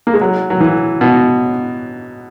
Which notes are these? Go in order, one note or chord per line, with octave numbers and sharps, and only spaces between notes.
A#3
G#3
F#3
F#3
E3
B2